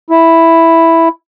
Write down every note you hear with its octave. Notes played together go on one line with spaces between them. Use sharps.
E4